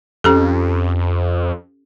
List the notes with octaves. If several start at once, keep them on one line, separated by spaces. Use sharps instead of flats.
F2 C#4 G4 A4